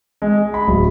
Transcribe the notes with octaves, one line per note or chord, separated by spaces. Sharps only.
G#3
G#4
B5
D1